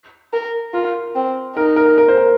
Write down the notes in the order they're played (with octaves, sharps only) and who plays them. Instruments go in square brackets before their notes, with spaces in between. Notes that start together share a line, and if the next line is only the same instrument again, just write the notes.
[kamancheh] A#4
[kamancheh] F4 [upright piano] A#4
[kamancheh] C4
[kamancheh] D#4 [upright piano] A#4
[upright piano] A#4
A#4
C5
A#4